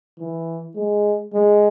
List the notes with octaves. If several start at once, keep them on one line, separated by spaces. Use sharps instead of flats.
E3
G#3
G#3